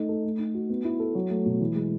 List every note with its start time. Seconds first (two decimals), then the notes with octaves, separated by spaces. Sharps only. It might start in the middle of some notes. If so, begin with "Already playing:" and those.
Already playing: A3 D#4
0.09 A4
0.24 A3
0.39 D#4
0.54 F#4
0.70 B3
0.84 E4
1.00 A4
1.15 F#3
1.30 A3
1.46 B2
1.61 E3
1.75 G#3